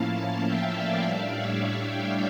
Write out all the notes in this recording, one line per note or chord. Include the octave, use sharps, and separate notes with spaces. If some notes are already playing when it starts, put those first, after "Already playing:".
Already playing: A2 F3 A#3 C#4 E4 F5 A5
F5 A5
E5 G5
D5 F5
A2 G3 D4 D5 F5
C#5 E5
D5 F5
E5 G5